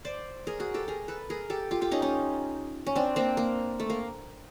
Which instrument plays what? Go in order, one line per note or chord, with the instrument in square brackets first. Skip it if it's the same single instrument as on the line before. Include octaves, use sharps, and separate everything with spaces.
[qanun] C5 D5
G#4 A#4
F#4 G#4
G4 A4
G#4 A#4
A4 B4
G#4 A#4
G4 A4
F4 G4
F4 G4
C#4 D#4
C#4 D#4
C#4
C4 D4
A#3 C4
A#3
A3
A#3